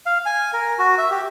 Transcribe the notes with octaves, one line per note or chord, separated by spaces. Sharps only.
F5
G#5
A#4
F#4
E5
G4